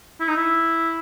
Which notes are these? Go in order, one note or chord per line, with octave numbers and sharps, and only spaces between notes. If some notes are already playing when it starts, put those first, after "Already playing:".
E4
D#4
E4